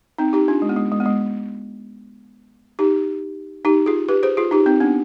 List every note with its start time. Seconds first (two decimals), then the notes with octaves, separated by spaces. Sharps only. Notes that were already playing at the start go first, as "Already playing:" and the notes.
0.18 C4 D#4
0.33 D#4 G4
0.48 D4 F4
0.62 G#3
0.69 B3
0.76 G#3
0.92 G#3
1.00 B3
1.05 G#3
2.79 D#4 G4
3.65 D#4 G4
3.86 F4 G#4
4.09 G4 B4
4.23 G#4 C5
4.37 F4 G#4
4.51 D#4 G4
4.66 C4 D#4
4.80 B3 D4